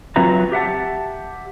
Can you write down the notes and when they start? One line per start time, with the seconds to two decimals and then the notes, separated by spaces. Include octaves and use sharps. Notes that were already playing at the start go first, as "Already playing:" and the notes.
0.16 F#3 C4 F4 B4 E5 A#5
0.52 G4 E5 F#5 A5